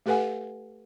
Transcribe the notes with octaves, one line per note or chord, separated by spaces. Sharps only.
A3 G4 A4 B4 F#5 G#5